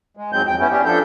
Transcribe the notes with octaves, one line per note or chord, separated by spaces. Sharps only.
G#3
G#2 F#3 G#3 C4 G6
F2 G5
B3 C#4 E4
C#4 D4 G4
F3 D4 A4 G6